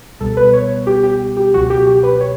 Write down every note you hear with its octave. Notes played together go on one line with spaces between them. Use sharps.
C#2 B2 G3 B3 A4
B4
C#5
G4
G4
G4
C#2 B2 F#3 F#4
G4
G4
B4
C#5